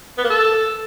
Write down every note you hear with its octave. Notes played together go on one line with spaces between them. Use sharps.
B3
A#3
A4